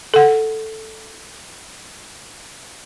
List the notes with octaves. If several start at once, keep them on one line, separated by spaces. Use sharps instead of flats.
A4 F#5